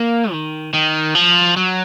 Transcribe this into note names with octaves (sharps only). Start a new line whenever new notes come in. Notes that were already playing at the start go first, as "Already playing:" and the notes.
Already playing: A#3
D#3
D#3
F3
F#3